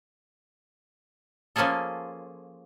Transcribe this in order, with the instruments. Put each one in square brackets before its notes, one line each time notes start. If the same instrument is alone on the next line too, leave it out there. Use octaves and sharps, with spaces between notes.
[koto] F3 A#3 C#4 F4 G#4 A4